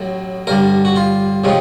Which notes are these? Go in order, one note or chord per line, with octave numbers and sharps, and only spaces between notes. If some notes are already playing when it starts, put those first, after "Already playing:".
Already playing: A1 A2 F#3
A1 G2 D3 A#4
F#4
F4
C3 F3 G#3 C#4